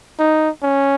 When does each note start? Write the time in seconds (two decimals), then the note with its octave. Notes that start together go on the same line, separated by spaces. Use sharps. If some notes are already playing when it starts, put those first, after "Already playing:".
0.19 D#4
0.62 C#4